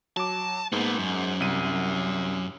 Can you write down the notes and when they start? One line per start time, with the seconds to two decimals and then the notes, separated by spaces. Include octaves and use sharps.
0.17 F#3 A5 D6
0.72 G#2 A#3 B3
0.99 F#2
1.40 C2 D#7